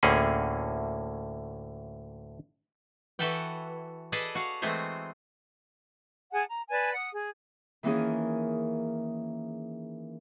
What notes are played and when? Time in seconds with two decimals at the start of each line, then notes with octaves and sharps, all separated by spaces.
0.03 D2 A2 D3 A#3 C#4 G#4
3.19 E3 F#4 A4 B4 F#5 G5
4.12 G#4 A4 B4 D5 D#5
4.35 F#4 F5
4.62 E3 G#3 A3 C4 G#4 C5
6.32 G#4 F#5 G#5 A5
6.49 A#5
6.70 B4 D5 G#5 A5
6.93 F#5 D#6
7.12 G#4
7.83 D#3 E3 A#3 C#4 G#4